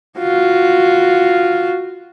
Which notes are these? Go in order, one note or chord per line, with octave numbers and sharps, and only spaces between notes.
F4 F#4